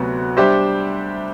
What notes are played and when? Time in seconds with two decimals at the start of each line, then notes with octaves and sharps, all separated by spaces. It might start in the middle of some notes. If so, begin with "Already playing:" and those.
Already playing: D2 C3 F#3 B3 F#4
0.37 G3 D4 G4 C5 E5